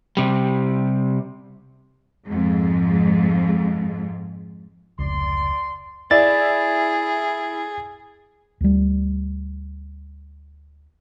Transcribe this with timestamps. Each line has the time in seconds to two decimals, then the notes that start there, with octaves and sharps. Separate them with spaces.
0.17 C3 G3
2.25 F2 G#2
4.99 F1 C#2 D5 C6
6.11 E4 G#4 D5 E5 A6
8.61 D2 G3